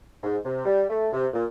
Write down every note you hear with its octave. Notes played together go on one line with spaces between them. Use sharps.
G#2
C3
G3
A3
C3
A#2